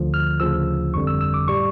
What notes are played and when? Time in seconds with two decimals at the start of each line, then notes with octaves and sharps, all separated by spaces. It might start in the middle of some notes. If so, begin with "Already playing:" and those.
Already playing: D2 D3 F3
0.14 F6
0.40 D2 C#3 F3 E6
0.94 G1 F2 D3 G3 C#6
1.07 E6
1.21 E6
1.34 D6
1.48 A2 G3 C#6